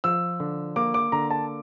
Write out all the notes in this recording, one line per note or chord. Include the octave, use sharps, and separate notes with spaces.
F3 E6
D3
A#3 D6
D6
D3 A#5
A5